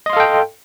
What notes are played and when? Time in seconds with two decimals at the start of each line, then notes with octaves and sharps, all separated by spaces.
0.06 D#5
0.10 C6
0.13 F5
0.17 A4
0.20 G5